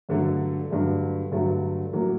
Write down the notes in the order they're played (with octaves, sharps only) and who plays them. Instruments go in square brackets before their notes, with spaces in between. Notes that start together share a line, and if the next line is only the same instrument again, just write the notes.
[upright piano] G2 D3 F#3 A3
G2 D3 F#3 A3
G2 D3 F#3 A3
A2 F#3 A#3